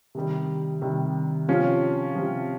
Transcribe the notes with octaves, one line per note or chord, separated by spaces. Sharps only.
C3 D#3 G3
C3 D#3 G3
C3 F3 C#4 F4
C3 F3